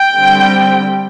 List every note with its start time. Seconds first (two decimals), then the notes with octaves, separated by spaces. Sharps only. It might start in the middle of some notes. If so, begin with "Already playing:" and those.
Already playing: G5
0.16 D3 G3 C4